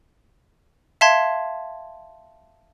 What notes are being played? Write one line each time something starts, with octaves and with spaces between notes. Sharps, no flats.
E5 F5 A5 C6 G#6